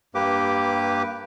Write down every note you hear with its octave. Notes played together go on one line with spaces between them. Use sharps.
G2 A#3 G4 B4 D6